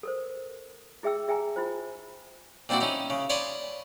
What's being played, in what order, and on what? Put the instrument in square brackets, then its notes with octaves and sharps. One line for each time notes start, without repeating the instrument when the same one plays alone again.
[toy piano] A4 A#4 C5
E4 G#4 E5 G5 E6
G#4 E5 G5 G#5 A#5
E4 F4 C5
[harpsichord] A#2 C4 D4 E4 F#4
C#4 D#4 E4
C#3
C#5 D5 B5 C6 D#6